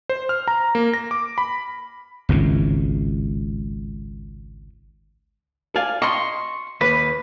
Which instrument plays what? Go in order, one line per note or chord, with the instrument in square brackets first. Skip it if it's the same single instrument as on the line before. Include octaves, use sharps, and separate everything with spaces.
[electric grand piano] C5
F6
A#5
A#3
A#6
D6
B5
[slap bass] G#1 C#2 A2
[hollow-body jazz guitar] D5 F5 G#5
[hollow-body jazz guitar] D#5 [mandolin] C6 C#6
[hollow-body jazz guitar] D#2 [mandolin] B4